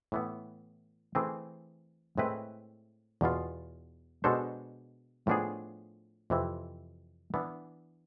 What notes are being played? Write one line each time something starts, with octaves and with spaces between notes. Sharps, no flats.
A2 E3 B3
E3 A3 C4 G#4
A2 G#3 C4 E4 B4
E2 B2 B3 F4
B2 G#3 D4 A4 C5
A2 F3 B3 D4 G#4
F2 C3 E3
E3 B3 D4